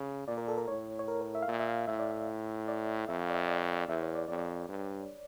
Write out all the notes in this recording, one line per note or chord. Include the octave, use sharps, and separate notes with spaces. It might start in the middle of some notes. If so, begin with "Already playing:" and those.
Already playing: C#3
A#2 D5
A#4
A4
A#4
A2 C#5
C#5
A#4
A#4
E5
F5
A#2 E5
E5
F5
A2 E5
D5
E5
D5
F2 E5
F5
D5
E5
D5
D5
E2 E5
C#5
D5
F2 D5
G2